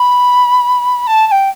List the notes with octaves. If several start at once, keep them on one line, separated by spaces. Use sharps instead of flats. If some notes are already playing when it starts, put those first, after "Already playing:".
Already playing: B5
A5
A5
G5